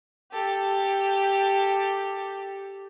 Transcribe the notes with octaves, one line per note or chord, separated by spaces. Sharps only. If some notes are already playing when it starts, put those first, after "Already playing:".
G4 A4